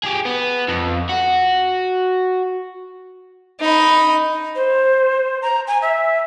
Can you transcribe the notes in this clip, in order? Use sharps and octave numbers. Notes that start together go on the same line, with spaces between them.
G4 G#4
B3
F2
F#4
D#4 B5
C5
A#5
G#5
E5